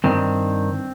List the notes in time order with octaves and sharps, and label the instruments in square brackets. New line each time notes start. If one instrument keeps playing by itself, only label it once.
[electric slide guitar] G2 D#3 C4